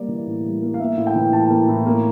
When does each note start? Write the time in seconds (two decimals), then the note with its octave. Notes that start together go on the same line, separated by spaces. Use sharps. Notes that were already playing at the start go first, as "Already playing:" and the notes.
Already playing: G3 A#3 D5
0.08 E3
0.27 A2
0.44 G3
0.62 A#3
0.74 F5
0.79 A#3 E5
0.97 A2
1.07 G5
1.15 E3
1.33 A2 A5
1.50 A#3
1.68 A2
1.86 A#3